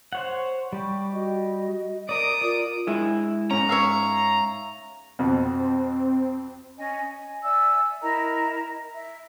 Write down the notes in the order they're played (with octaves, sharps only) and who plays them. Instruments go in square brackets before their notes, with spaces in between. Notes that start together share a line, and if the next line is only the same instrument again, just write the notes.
[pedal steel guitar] C5 C#5 F#5
[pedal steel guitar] G3 G4 [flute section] C#6
[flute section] F#4 D#5
[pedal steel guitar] A#4 D5 [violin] D#6 D7
[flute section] F4 A#4 [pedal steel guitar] D5
[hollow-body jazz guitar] G#3 E4
[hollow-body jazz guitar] G#2 C#4 [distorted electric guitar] A#5
[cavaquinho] C#5 E5 F5
[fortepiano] F2 B2 [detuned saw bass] C4
[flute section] C#4 D#5 G#5
G#5
D5 E5 G#5 E6
E4 A#4 D#5 A#5
E5